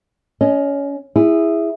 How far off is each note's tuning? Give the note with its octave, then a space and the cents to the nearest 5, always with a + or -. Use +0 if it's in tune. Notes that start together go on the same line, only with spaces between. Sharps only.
C#4 +20 D#5 +0
E4 +0 G#4 -15